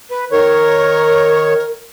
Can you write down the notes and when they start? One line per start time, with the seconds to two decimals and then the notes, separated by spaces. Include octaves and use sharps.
0.11 B4
0.32 D#3 A#4 C#5